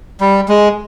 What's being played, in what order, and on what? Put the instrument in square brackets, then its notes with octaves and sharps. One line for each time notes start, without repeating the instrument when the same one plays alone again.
[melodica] G3
G#3